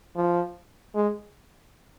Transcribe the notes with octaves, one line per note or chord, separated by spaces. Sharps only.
F3
G#3